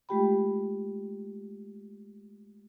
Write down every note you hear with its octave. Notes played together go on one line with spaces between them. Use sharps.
G#3 A3 F4 G4 G5 B5